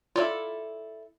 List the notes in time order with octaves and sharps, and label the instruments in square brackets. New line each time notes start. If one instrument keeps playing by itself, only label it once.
[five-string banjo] E4 A4 D5 [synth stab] F4